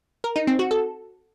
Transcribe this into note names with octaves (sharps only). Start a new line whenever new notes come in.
A#4
D#4
C4
F#4
A4